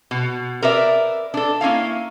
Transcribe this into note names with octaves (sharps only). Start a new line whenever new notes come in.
B2
A#4 B4 D5 E5
D4 A4
A#3 C#4 E4 F5